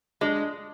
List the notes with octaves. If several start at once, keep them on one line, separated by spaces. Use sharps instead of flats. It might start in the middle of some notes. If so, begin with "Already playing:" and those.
G#3 D4